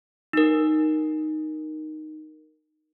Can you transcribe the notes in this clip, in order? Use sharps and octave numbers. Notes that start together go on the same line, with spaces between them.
D#4 A#4